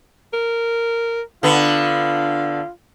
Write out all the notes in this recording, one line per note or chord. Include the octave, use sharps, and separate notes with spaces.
A#4
D3 B3 F4